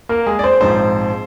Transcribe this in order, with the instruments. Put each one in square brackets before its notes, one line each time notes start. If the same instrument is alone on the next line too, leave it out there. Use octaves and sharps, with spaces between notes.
[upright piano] A#3 A#4
G#3 G#4
D5
C4 C5
A#1 G#2 F3 G#3 C4 C5